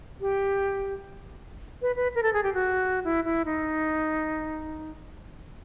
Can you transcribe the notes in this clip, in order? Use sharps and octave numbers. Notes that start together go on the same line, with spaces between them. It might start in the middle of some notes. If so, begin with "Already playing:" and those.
G4
B4
B4
A#4
A4
G#4
G4
F#4
E4
E4
D#4